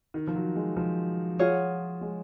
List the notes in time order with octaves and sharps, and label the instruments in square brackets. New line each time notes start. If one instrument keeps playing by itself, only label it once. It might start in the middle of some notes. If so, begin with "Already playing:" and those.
[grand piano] D#3
F3
F#3
G#3
F3
[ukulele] F4 G#4 C#5 F#5
[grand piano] G#3